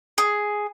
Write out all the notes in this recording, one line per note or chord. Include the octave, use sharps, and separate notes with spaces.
G#4